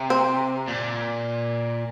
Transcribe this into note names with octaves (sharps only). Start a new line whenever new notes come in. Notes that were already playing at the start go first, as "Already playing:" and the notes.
Already playing: C3
C4
A#2